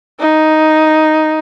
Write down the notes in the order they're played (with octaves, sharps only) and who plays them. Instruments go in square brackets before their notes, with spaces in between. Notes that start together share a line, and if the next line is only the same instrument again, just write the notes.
[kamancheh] D#4